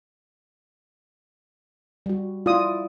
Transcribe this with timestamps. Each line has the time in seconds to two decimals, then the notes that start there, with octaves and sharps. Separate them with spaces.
2.06 G3 F#4
2.46 E4 F4 D5 D#6